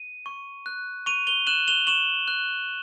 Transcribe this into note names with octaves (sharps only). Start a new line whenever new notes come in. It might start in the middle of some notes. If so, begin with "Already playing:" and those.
Already playing: D#7
C#6
F#6
C#6 D#7 F7
F7 G7
F#6 E7 F#7
F7 G7
C#6 E7 F#7
F#6